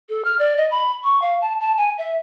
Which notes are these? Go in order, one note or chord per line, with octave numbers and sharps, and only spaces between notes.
A4
F6
D5
D#5
B5
C#6
F5
A5
A5
G#5
E5